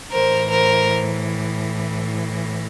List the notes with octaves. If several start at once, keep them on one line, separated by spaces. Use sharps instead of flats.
A2 E3 A#4 C5
A#4 C5